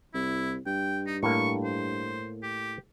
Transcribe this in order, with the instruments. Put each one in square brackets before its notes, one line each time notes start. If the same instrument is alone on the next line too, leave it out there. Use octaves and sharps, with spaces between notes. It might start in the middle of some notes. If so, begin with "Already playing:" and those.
[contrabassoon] C2 [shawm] E4
[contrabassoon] G2 [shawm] G5
[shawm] D#4
[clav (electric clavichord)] A2 A#3 [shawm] C#6
[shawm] C5
G4